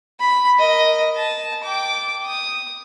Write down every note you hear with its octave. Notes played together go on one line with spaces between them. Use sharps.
B5
A#4 D#5
A5
G5 D6
D#6